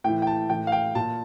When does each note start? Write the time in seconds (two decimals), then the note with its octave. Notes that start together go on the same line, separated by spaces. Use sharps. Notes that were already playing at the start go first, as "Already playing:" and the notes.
0.04 A2 E3 G5
0.22 G5
0.27 A5
0.50 A2 E3 G5
0.67 F5
0.72 G5
0.95 A#2 A5